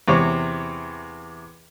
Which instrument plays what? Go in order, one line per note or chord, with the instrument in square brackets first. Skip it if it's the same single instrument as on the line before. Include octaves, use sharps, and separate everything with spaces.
[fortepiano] E2 C3 C#5